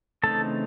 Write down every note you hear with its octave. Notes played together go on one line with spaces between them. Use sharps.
C#3 E3 A3 C4 D#4 A4 A5